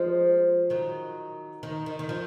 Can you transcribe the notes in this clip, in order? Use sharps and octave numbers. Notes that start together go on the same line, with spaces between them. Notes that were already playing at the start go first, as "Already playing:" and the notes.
Already playing: F3 G#3
D#3 F#3
D#3
D#3
D#3
F3